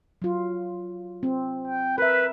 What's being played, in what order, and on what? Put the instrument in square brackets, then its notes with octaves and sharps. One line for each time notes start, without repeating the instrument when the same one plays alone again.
[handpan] F#3 F4
C4
[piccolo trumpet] G5
[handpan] A#4 E5 [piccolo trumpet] B4